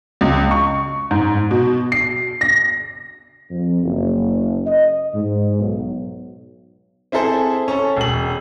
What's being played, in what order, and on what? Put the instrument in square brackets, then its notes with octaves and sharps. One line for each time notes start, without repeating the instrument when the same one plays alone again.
[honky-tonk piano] C#2
C#6
G#2
B2
C7
A#6
[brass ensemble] F2
F#1
D#5
G#2
B1
[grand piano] C4 E4 G#4 A4 C5
C#4 A4
E1 F#7